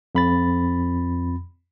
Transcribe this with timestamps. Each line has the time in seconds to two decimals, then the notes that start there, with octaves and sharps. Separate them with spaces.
0.15 F2 B5 A6